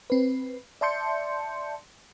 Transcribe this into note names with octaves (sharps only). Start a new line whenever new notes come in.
C4 B4
D5 E5 A5 C6 G6 C#7